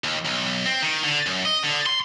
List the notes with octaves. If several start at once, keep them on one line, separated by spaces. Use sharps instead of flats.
D#2
B1
C4
D#3
D3
F#2
D#5
D3
C6